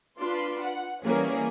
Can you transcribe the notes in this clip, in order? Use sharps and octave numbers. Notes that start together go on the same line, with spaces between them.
D4 F4 B4 C6
F#5
E3 G3 A#3 C#4 G#4